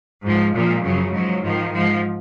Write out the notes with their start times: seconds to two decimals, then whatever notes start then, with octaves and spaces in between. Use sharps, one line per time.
0.23 G#2 F3
0.54 A#2 F3 G#3
0.84 F#2 C#3 F3 F#3
1.13 G#2 F3 F#3
1.43 G#2 D#3 F3
1.73 G#2 F3